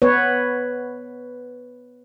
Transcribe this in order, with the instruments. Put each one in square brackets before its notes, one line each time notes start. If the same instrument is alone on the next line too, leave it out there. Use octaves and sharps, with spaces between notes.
[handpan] B3 B4 C#5